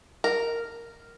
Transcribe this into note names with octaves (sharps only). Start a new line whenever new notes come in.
A#4